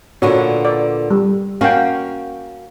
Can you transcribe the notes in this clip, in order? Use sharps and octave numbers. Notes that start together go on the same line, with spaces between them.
A#2 D3 B3 F#4 C#5
D5
G3
A#3 C#4 F#4 F5 G5